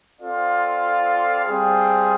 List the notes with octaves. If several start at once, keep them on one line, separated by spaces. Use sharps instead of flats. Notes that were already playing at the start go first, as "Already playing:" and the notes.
C4 F4 A4 D5 F5
G3 C4 F4 G#4